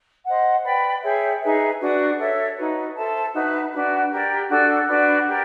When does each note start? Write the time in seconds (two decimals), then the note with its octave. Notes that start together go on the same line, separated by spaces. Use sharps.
0.24 C5 D#5 F#5
0.63 B4 D5 G5 B5
1.03 G#4 C#5 E5 G5
1.41 D#4 G#4 B4 E5
1.79 D4 F#4 B4
2.18 A4 C#5 E5
2.56 D#4 F#4 B4
2.95 A4 C5 E5 A5
3.34 D#4 F#4 B4 E5
3.73 D4 F#4 B4
4.11 G4 A#4 D5
4.50 D4 F#4 A4
4.88 D4 F#4 B4 D5
5.27 G4 A#4 D5